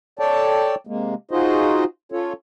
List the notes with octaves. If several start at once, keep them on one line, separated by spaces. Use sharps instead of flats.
A4 C#5 D5 G5 A5
C3 G#3 A#3
D#4 F4 F#4 G#4 C5 D#5
C#4 F4 A4 C#5